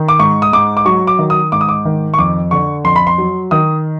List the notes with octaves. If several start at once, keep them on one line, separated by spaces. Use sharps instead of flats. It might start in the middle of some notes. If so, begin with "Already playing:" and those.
Already playing: D#3
D6
G#2 C#6
D#6
G#2 D6
D6
F#3 C#6
D6
D#3
D#6
G#2 D6
D#6
D6
D#3
C#6
F2 D6
D3 C#6
F2 C6
B5
C6
F#3
D#3 D#6